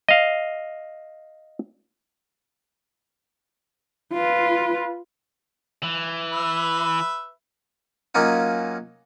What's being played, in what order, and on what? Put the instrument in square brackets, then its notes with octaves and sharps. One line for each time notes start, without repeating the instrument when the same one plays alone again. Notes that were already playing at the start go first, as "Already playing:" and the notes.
[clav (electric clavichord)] D#5 F5
[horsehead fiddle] F4 B4
[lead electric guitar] E3
[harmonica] B4 E5
[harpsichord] F#3 A#3 C#4 D#4 F4